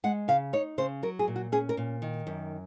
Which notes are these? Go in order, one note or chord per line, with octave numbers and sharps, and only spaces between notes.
G#3 F#5
C#3 F5
D#4 C#5
C#3 C5
F#3 A#4
G#4
A#2
F#4
C#4 G#4
A#4
A#2
D#3
F#2